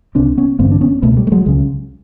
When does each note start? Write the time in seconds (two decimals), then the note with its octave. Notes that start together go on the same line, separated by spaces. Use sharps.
0.15 C#2 C3 C4 D4
0.37 B3 C#4
0.59 A1 G2 D3 A#3 C4
0.71 D4
0.81 B3 C#4
1.02 C#2 B2 A3 B3
1.17 G3 A3
1.27 A3
1.32 F#3 G#3
1.46 C#2 C#3